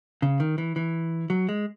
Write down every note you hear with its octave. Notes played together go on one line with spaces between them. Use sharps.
C#3
D#3
E3
E3
F#3
G#3